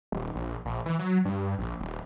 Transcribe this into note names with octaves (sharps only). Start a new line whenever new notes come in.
D#1
A#1
A#1
E3
F#3
G2
A#1
D#1